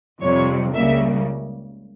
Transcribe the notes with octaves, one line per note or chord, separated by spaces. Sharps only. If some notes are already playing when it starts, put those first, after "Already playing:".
F2 C3 G3 C#5
C#2 C#3 G3 A#3 E5